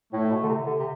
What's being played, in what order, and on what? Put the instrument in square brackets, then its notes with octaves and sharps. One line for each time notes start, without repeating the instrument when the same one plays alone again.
[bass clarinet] A2 [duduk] A3
[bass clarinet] A2
B2
D3
C3
D3
C3